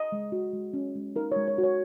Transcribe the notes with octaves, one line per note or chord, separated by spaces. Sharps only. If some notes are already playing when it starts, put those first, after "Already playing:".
Already playing: D#5
G#3
F#4
G#3
C#4
G#3
D#4 A#4
G#3 C#5
C#5
F#4
C#5